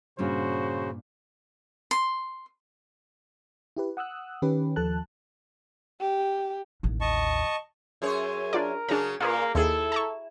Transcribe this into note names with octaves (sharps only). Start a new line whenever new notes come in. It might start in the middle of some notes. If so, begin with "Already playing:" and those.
G2 A#2 C#3 C#4 F#4 C5
C6
E4 G4 B4
F#5 D#6 E6 F#6
D#3 C#4 G4 B4
D#2 F3 A4 A5 F#6
G4
A1 D#2
D#5 A5 C#6
F#2 G#4 C#5
D4 F4 A#4 D5
C#3 F#3 D4 G#4 A#5
A#2 A#3 F4 G#4 B4
D#2 E4 G#4 A4
A5 A#5 C#6